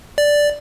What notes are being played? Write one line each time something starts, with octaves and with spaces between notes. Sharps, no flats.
D5